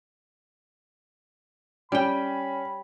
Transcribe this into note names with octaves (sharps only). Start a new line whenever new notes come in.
G3 C#4 G5 B5